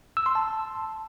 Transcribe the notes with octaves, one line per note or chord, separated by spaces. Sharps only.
E6
C6
A5